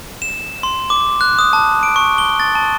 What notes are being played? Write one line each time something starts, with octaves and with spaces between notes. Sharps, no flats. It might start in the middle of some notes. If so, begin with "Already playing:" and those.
E7
C6
D6
F#6
D#6
A5
D7
C#6
G7
A6
A5